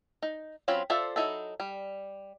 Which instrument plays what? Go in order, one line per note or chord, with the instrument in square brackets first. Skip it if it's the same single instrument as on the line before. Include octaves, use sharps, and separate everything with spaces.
[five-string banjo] D#4
F#3 C4 C#4 F4 B5
F4 A4 C5 D5 E5
F#3 G3 D#4 E4 A4
G3